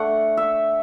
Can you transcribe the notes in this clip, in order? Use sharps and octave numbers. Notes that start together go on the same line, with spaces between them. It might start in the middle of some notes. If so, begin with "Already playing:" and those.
Already playing: A3 D4 F#5
E5